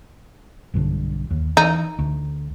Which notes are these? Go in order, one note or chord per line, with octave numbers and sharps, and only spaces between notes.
B1 G2 D3
D#2
E3 D#4
D2